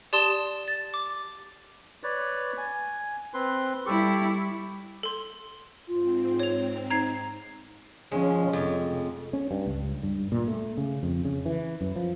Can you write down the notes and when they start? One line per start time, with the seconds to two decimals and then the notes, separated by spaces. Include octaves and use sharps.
0.13 G4 D5 A5 C6 D#6 E7
0.68 A6
0.94 D6
2.03 B4 C#5 D5
2.58 G#5
3.34 C4 B4 C6
3.86 G3 E4 G4 A4 C#6
5.03 A4 C6
5.88 G#2 C4 F4
6.40 C#5 F7
6.90 D#4 A#5 G#6 C7
8.12 F3 G#3 C#4
8.53 F1 F2
9.33 C#4
9.51 G2
9.66 C#2
10.03 G2
10.32 A#2
10.48 A3
10.77 C#3
11.03 F2
11.25 C#3
11.46 E3
11.81 F#2
11.96 F3